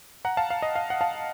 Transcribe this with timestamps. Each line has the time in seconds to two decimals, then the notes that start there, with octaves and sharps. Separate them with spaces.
0.25 F#5 A#5
0.37 F5 A5
0.50 F5
0.62 D#5
0.76 F5
0.90 F#5
1.01 F5 A5